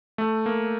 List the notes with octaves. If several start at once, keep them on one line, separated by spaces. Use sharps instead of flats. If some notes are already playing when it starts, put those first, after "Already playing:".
A3
A#3